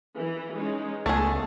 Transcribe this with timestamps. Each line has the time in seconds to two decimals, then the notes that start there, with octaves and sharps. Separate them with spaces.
0.16 E3
0.54 G#3 C#4 D#4
1.06 C#2 A3 B3 G#4